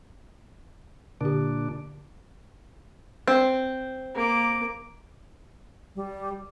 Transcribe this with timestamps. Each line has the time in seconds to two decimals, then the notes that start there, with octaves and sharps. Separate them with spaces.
1.21 A#2 D3 D4 G4
3.28 C4
4.14 A#3 D6
5.95 G3